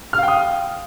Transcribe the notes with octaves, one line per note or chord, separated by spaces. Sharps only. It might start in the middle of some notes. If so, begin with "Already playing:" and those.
F5 G5 D#6 F6